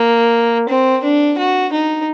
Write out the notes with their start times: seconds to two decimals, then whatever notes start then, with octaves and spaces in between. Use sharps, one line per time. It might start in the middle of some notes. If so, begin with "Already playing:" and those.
Already playing: A#3
0.69 C4
1.04 D4
1.38 F#4
1.73 D#4